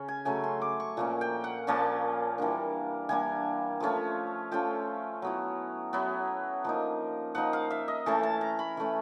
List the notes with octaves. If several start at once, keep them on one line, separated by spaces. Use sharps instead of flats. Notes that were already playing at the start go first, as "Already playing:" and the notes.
Already playing: C#3 C#4
G#5
C#3 F#3 A3 C#4 G#5
C6
D6
C#6
A#2 F3 A#3 C#4
G5
F#5
A#2 F3 A#3 C#4 A5
E3 G3 A#3 D4
E3 G3 A#3 D4 G#5
F3 A3 C#4 F4
F3 A3 C#4 F4 G5
F#3 B3 E4
F#3 B3 E4
F3 A#3 D#4
F3 A#3 D#4 F#5
F5
E5
D#5
E3 A3 C#4 A5
A5
A#5
B5
E3 A3 C#4